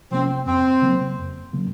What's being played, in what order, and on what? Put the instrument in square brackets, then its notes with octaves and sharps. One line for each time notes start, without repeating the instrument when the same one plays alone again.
[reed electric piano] C3 F3 A#3 C#4 [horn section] C4
[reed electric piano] F2 [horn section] C4
[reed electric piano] C#3 F#3 A#3
F2
C#3 F#3 A#3